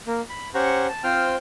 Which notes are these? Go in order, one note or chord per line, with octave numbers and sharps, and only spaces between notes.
A#3
B5
C#4 G4 C5 F#5 A#5 C#6
A5
C4 F4 C5 G5 F6